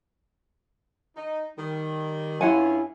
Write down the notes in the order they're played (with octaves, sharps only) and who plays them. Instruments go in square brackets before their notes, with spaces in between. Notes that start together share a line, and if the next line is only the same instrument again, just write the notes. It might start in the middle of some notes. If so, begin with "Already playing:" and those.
[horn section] D#4
D#3 G3
[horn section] G2 C#4 F4 [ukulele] E4 F#5 G#5